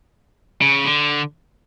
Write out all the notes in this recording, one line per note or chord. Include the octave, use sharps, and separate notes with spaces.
C#3
D3